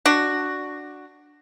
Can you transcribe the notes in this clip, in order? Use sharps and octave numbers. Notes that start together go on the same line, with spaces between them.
D4 F#4